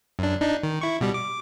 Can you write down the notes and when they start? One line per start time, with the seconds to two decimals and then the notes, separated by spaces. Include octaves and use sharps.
0.19 F#2 D4
0.41 D4 D#4
0.63 D#3
0.81 E4 C#6
1.01 B2 G3
1.14 D6